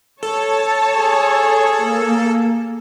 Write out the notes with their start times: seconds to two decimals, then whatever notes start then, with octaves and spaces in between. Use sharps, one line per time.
0.23 A4 C#5 A5
0.97 G#4
1.84 A#3